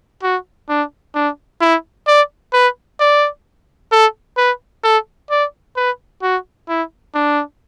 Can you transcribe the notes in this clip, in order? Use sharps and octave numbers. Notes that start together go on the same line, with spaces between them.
F#4
D4
D4
E4
D5
B4
D5
A4
B4
A4
D5
B4
F#4
E4
D4